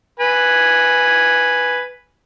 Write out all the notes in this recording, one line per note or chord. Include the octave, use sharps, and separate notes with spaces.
B4 G#5